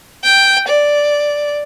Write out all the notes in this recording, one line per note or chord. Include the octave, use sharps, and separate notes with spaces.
G5
D5